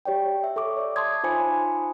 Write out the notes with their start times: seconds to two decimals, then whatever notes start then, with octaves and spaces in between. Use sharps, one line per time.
0.05 G4 C#5 D5 G5
0.44 E5
0.56 A4 C#6 D6
0.77 C#5 D5 E5
0.96 A5 C6 D6 D#6 G#6
1.23 D#4 F4 C5 G#5 B5 C#7